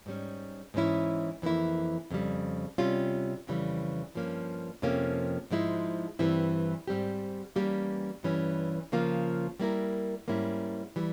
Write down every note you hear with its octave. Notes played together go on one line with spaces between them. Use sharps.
G#2 G3 C#4
G#2 E3 G#3 C#4 E4
F2 E3 A#3 E4
F2 C#3 G3
C3 G3 C#4 F4
F2 C#3 E3 G3
G2 F3 A#3 C#4
F2 C3 F3 A#3 C#4
G#2 F3 G#3 E4
G2 E3 G3 C4 E4
G#2 G3 C4 G4
E3 G3 A#3 C#4 G4
G2 E3 G3 C#4
C#3 F3 A#3 F4
G3 A#3 E4 A#4
G#2 G3 A#3 C#4 E4
E3 G3